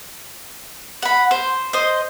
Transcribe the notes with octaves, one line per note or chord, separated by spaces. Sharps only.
F#5 B5
C5
C5 D#5